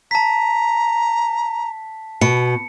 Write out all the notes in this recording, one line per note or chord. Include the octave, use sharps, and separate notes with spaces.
A5 A#5 B6
B2 C#7